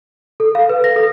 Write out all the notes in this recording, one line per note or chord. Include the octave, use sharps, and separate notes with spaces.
A4
F5
B4
A#6
A4